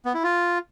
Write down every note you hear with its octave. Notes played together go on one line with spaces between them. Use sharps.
B3
E4
F4